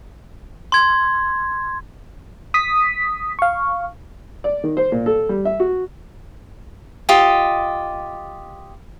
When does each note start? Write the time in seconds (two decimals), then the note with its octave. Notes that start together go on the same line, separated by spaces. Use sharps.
0.72 C6 G#6
2.54 D#6 B6
3.39 F5 C#6
4.44 D5
4.64 D#3
4.77 C5
4.92 A#2
5.06 A4
5.29 G3
5.45 E5
5.60 F#4
7.09 F4 G4 D#5